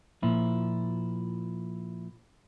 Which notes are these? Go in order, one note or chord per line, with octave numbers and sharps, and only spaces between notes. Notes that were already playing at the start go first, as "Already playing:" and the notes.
A#2 F3 E4